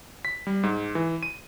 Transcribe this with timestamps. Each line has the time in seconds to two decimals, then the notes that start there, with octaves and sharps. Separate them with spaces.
0.25 B6
0.47 G3
0.63 G#2
0.95 E3
1.23 D#7